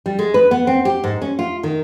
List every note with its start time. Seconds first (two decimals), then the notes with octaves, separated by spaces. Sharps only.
0.06 G3
0.19 G#3
0.34 B4
0.51 B3
0.67 C4
0.85 G4
1.04 G#2
1.22 C#4
1.39 F4
1.63 D#3